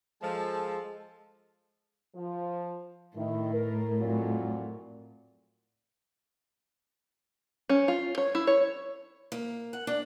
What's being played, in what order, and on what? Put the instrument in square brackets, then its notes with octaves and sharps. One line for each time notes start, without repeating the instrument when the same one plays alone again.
[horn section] F3 [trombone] G#3 [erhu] A4
[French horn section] F3
[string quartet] A2 [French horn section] D#3 E4
[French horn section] A#4
F2 A#2 F#3
[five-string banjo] C#4
F4
C#5
E4
C#5
[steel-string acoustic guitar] A#3
F#5
D4